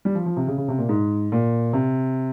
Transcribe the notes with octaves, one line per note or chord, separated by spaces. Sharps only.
G3
F3
F3
C3
C#3
C#3
C3
A#2
G#2
A#2
C3